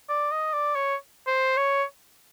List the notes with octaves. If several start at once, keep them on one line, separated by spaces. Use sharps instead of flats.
D5
D#5
D5
C#5
C5
C#5